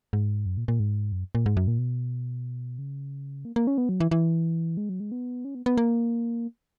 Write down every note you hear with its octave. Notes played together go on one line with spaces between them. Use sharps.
G#2
F#2
A#2
A#2
G#2
F#2
A#2
G#2
F#2
A#2
B2
C#3
A#3
A#3
C#4
B3
F#3
E3
E3
G#3
F#3
G#3
B3
C#4
B3
B3
A#3